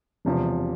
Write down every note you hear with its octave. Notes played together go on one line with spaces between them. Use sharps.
E1 E2 C3 F3